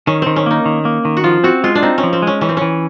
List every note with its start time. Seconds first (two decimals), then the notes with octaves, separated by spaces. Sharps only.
0.07 D#3 C#4
0.22 D#3 C4
0.36 C#4
0.46 A#3 D#4
0.66 D#3
0.85 A#3
1.05 D#3
1.17 F#4
1.24 F3 F4
1.44 C4 F#4
1.64 G#3 F4
1.75 D4
1.83 C4 D#4
1.98 C#4
2.03 F3
2.13 C4
2.22 G#3 C#4
2.41 E3 C#4
2.49 C4
2.57 E3 C#4